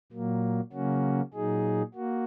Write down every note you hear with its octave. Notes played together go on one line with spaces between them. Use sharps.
A#2 F#3 A#3
C#3 F#3 A#3 C#4 F#4
A#2 F#3 D#4 G#4
A#3 F#4